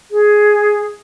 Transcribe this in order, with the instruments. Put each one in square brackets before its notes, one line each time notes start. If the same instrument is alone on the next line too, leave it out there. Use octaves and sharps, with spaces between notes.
[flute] G#4